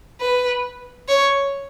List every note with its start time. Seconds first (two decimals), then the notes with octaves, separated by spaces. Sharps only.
0.20 B4
1.08 C#5